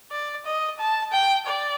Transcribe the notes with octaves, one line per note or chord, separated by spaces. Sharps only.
D5
D#5
A5
G5
D5